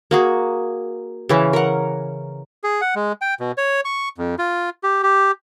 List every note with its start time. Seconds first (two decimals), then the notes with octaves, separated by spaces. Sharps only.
0.11 A#3 F#4 G#4
1.29 C#3 E3 C#4
1.53 A#4 F#5
2.64 G#4
2.81 F#5
2.95 G#3
3.21 G5
3.40 B2
3.58 C#5
3.85 C#6
4.18 F2
4.39 F4
4.83 G4
5.03 G4